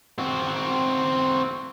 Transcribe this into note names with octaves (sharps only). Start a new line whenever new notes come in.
C4 F#4